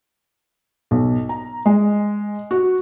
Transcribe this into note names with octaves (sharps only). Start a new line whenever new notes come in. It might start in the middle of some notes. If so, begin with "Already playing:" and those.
B1
A#5
G#3
F#4